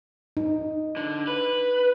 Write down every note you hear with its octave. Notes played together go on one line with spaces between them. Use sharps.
D#4
D3
B4